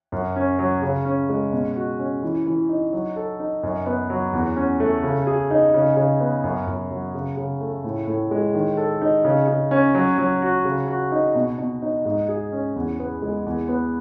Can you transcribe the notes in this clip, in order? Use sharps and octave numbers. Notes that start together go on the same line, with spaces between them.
F#2
C#4
F#3
C#3
C#4
G#3
B2
F#4
C#4
E3
E3
D#4
F#3
A4
D#4
F#2
B3
F#3
E2
C#4
A3
C#3
G#4
D#4
C#3
C#3
B3
F#2
F#2
F#3
C#3
C#3
A3
A2
A2
G#3
D#3
A4
D#4
C#3
C#3
C#4
F#3
F#3
F#4
C#3
F#4
D#4
B2
B2
D#4
G#2
G#4
C#4
E2
B3
G#3
E2
B3